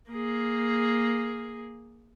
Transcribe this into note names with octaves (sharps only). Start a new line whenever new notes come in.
A#3 G#4